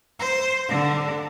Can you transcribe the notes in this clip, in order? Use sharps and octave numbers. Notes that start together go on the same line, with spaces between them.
C5
D3